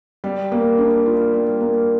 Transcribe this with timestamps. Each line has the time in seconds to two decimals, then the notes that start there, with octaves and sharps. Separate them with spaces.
0.24 G3
0.52 A#3
0.78 D4
1.06 F4
1.34 G3
1.61 A#3